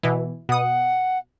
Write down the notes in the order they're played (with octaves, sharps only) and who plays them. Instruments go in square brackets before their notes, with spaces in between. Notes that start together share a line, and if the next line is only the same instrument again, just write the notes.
[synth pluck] B2 E3
[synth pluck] B2 D#6 [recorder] F#5